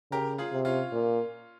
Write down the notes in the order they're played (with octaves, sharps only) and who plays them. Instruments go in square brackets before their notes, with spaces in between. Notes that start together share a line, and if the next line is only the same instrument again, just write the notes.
[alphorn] C#3 [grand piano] G4 A#4
[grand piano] F4 G#4
[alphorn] C3
[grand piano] C#4 F4
[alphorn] A#2